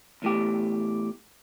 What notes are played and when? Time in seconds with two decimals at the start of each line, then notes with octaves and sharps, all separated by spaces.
0.22 E2 A2 G4